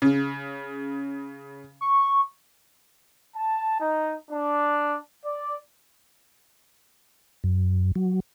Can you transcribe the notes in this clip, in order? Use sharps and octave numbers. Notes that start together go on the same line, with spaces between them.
C#3
C#6
A5
D#4
D4
D5
F#2
F#3